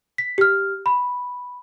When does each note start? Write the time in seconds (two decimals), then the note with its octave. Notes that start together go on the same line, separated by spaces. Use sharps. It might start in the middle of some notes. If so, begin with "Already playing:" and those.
0.18 B6
0.38 G4 F6
0.86 B5